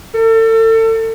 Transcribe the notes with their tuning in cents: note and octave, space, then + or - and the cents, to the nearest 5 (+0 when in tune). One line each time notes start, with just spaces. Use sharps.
A4 +35